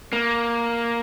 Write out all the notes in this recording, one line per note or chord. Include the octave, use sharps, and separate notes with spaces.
A#3